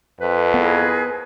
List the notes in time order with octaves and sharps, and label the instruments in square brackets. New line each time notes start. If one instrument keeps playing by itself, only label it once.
[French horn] F2 [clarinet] B4
[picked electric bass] B3 [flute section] E4 G#4 A#4